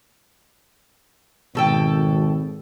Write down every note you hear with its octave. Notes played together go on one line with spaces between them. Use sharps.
G#1 B2 A4 G5